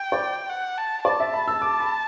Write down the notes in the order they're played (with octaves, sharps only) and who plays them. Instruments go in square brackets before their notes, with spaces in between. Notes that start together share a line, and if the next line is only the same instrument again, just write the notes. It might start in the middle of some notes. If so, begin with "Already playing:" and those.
Already playing: [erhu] G5
[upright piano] D5
[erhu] F#5
A5
[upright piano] D5 [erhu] A5
[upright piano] E5
B5
E6
D6
B5